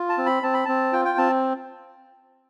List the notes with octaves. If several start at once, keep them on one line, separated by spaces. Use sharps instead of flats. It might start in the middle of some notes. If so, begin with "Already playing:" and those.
Already playing: F4
A5
C4
B5
C4 A5
B5
C4 A5
F4 G5
G5
C4 A5